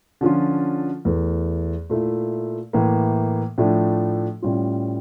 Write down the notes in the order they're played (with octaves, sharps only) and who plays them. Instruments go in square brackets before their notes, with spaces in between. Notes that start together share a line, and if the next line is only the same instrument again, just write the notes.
[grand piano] D3 F3 C#4 F4
E2 E3 A3
A#2 A3 E4
A2 E3 A#3
A2 F3 A3 D4
A2 G3 C#4 F4